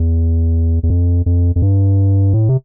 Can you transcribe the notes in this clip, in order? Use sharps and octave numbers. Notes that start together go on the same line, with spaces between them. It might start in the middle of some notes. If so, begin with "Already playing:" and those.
Already playing: E2
E2
F2
F2
F2
G2
A2
C3